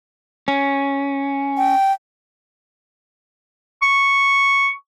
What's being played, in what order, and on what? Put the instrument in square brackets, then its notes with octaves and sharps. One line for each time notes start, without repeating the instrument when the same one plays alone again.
[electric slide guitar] C#4
[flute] G5
[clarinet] C#6